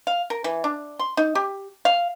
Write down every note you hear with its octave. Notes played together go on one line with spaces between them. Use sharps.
F5
A#4
E3
D4
C6
D#4
G4
F5